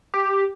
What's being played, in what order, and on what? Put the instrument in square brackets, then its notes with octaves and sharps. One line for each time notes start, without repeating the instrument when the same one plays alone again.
[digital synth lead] G4